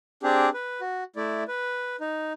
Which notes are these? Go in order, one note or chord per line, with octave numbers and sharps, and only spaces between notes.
C4 D4 G4 G#4
B4
F#4
A3 E4 D5
B4
D#4